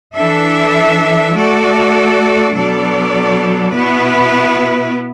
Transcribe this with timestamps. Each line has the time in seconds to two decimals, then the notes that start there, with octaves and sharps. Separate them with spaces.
0.15 E3 D4 A4 E5
1.34 A3 F#4 A4 D5
2.54 B2 F#3 D4 A4 D5
3.73 B2 B3 E4 B4